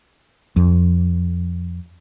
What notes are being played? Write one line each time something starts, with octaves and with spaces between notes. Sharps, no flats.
F2